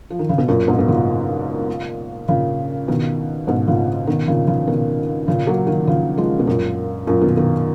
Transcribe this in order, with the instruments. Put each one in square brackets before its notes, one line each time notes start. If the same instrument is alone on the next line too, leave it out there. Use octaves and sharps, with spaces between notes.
[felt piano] F3
D#3
C#3
B2
F#2 A#2
G#2 B2
B2
A#2 C#3
A#2 C#3
B2 D#3
G#2 B2
A#2 C#3
B2 D#3
A#2 C#3
C#3 F3
B2 D#3
A#2 C#3
F#3 A#3
D#3 F#3
C#3 F3
F3 G#3
B2
F#2 A#2
F#2 A#2
B2 D#3
B2 D#3